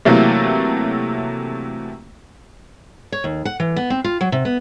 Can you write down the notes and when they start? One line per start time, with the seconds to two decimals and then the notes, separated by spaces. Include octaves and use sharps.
0.05 C3 E3 F#3 A3 A#3
3.12 C#5
3.24 D#2
3.45 F#5
3.60 E3
3.76 B3
3.90 C4
4.04 F4
4.21 F#3
4.32 C3
4.45 B3